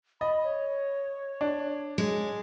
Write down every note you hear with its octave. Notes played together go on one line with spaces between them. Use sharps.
D#5 B5
C#5
D4
G#3